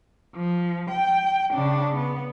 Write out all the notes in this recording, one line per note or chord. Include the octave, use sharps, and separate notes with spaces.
F3
G5
C#3 D4
B3